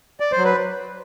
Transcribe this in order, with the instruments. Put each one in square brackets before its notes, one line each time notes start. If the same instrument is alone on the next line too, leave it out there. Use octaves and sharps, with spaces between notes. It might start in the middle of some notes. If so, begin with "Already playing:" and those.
[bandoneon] D5
C5
F#3
B4